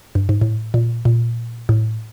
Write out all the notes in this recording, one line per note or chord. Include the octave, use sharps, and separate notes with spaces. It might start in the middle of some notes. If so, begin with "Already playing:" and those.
G2
G#2
A2
A#2
A#2
A2